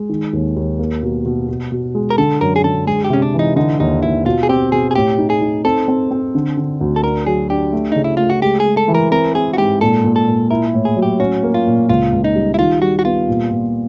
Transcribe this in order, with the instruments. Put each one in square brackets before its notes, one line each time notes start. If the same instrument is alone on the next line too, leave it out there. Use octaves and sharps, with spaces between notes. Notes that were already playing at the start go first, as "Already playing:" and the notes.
Already playing: [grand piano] G#3
D#3
D#2
D#2
A#3
B2
B2
B2
B2
G#3
[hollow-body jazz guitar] A#4
[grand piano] D3 [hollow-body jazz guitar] A4
[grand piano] F#2 [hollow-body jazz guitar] A#4
[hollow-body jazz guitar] G#4
[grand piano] D3 [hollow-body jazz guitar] A4
[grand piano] G#3 [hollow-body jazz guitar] G#4
[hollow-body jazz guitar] G4
[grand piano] C3 [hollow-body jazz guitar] C#4
[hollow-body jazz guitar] D4
[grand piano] E3
[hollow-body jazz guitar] D#4
[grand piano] D3 [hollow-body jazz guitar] D#4
[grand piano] D#2 [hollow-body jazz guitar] D#4
[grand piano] D#2 [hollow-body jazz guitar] E4
[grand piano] B2 [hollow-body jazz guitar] F4
[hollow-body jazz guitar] G#4
[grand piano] C4 [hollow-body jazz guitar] G4
[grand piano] B2 [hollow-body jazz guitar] G#4
[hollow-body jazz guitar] G#4
[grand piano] A2 [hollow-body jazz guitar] G4
[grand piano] D#4
[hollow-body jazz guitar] G#4
[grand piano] D#4
[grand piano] C4 [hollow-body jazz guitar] A4
[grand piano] C4
C4
D3
D3
D2
[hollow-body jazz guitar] A4
[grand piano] D4 [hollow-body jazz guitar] A#4
[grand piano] F#3 [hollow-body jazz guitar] G#4
[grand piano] D4 [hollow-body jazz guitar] G4
[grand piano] A3
[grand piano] C#3 [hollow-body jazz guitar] D#4
[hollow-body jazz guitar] E4
[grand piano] A3 [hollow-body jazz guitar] F4
[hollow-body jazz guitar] F#4
[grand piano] G#3 [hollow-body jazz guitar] G4
[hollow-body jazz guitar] G#4
[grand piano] G#3
[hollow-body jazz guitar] A4
[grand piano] E3
[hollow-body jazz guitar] A#4
[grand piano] C4 [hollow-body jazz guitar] A#4
[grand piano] C4 [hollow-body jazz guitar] G#4
[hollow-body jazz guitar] F#4
[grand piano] G#2 [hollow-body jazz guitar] G4
[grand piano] A#2 [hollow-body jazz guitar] A4
[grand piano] A#2
[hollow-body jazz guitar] A4
[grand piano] A#2
[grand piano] E4 [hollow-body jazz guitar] A#4
[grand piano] A2
[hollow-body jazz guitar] G#4
[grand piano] F#3
[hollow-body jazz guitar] G4
[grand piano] C#4 [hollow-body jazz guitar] F#4
[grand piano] A#3
[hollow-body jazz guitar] F4
[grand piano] A#2
[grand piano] C#2 [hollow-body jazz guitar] F4
[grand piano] C#2
[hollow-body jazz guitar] D#4
[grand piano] G3
[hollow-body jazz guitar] E4
[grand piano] D#3 [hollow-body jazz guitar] F4
[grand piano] G3 [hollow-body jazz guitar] F#4
[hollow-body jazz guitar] F#4
[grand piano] B3 [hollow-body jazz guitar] F4
[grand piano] A#2
A#2